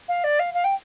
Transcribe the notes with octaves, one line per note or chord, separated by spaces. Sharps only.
F5
D5
F5
F5
G5